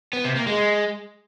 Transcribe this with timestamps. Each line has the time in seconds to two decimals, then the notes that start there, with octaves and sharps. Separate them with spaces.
0.13 B3
0.24 C3
0.36 A#3
0.47 G#3